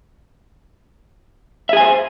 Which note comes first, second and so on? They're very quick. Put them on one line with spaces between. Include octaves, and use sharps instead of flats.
E5 G#4 G#5 C5